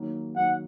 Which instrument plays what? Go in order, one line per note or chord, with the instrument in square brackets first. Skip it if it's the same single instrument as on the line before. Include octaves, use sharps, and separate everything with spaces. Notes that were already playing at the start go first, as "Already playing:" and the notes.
Already playing: [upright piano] D#3 F#3 A#3
[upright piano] D#3 F#3 A#3 [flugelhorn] F#5